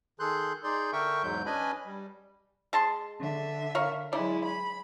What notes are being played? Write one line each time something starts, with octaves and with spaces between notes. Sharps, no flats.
D#3 G#4 A4 C6 F#6 G6
D#4 G#4 D5 C6 G6
D3 A#4 E5 G5 C#6
E2 G#2 F#3 G#3 G6
C#4 D4 B4 D#5 G#5 B5
G3
G#3 A5 C6
D3 E5
A#4 C#5 F5
F#3 G#3 E4 D5
B5